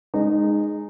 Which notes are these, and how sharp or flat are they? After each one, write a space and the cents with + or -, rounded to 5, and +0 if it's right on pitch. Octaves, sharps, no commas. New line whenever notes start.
G#3 +0 D#4 -20